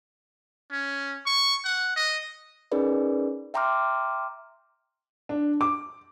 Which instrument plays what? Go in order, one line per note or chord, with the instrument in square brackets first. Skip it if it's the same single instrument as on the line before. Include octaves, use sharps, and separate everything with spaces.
[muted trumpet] C#4
C#6
F#5
D#5
[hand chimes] C#4 D#4 G#4 A#4 B4 D5
E5 G5 A#5 C6 D6 F6
[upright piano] D4
D6